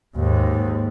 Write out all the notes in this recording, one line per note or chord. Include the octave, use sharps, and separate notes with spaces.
D#2 G#2